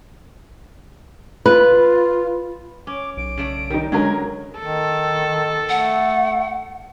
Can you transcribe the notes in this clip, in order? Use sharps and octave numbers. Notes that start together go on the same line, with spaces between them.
F4 B4
C#4 D6
B1 D7
C#3 A3 D5
D#3 G3 D#4
C#2 D3 F#3 G#3 C#4 G#4 A#4 G#6
D#3 A4
A3 F#5